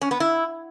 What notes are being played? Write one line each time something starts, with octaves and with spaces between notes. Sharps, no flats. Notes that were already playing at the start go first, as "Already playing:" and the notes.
C#4
B3
E4